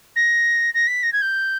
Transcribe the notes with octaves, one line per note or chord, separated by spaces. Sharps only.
A#6
A#6
B6
A#6
G#6
G6